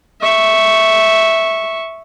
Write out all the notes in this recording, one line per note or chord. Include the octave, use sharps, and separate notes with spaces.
E5 C#6